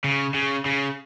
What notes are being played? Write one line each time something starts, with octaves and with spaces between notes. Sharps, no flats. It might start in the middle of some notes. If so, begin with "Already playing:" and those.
C#3
C#3
C#3